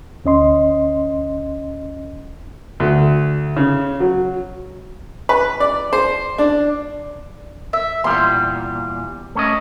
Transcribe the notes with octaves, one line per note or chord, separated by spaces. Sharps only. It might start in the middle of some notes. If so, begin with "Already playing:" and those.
D2 C#4 D#5 C6
D2
C#3
F#3
B4
D5
C5
D4
E5
E2 A#2 G3 C6
A3 C#4 D#5